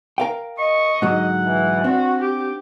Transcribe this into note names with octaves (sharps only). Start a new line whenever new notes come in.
A#4 F5 G5
D#5 C#6
G#2 D3 F#3 F#5
E3
C4 D4 F#4
G4 D6